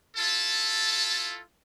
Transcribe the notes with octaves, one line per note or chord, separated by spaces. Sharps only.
E4 F4 A4 A5